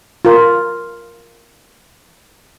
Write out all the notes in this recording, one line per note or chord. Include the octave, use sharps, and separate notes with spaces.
F4 A#4